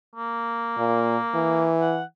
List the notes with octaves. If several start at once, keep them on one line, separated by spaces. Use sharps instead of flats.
A#3
A#2
E3
F#5